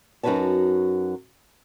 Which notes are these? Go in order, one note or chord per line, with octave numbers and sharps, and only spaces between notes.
F#2 D#4 F#4 B4 C#5 A5